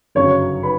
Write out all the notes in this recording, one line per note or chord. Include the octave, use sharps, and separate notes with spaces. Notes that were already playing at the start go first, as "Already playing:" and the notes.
G1 F#2 C#3 F#3 C#5 C#6
B4 B5